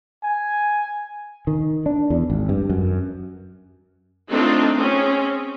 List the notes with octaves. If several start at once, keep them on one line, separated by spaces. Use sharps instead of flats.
G#5
D#3
D4
E2
G#1
G2
F#2
A3 C4 D4 D#4 F4
C4 C#4 G#4